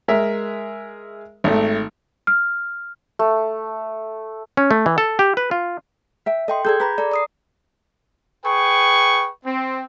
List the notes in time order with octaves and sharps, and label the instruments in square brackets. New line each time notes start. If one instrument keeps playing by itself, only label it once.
[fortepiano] G#3 A#4 E5
G#1 A3
[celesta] F6
[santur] A3
[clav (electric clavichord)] C#4
A3
E3
A4
G4
B4
F4
[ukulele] E5 G5
[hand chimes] A4 G5 C6 [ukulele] D#5
[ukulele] G#4 A4 D5 [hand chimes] G6 G#6
[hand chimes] G#4 A#5 B5 [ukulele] B4
[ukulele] A4 [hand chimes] D5 A#5
[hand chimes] D5 D#6 C7
[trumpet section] G#4 B4 G5 C#6
C4